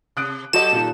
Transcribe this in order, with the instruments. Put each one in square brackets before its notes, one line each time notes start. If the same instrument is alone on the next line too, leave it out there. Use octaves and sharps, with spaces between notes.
[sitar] C3 [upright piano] D#6 F#6 D7
[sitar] F#3 G4 A4 [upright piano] F#4 D#5 [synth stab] E7
[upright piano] A#2 D#3